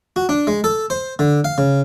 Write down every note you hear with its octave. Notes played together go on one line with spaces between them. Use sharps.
F#4
D4
G#3
A4
C5
D3
F5
C#3